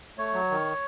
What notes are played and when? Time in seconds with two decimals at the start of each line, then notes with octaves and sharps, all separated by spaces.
0.18 A3 C#5
0.33 F#3
0.50 D#3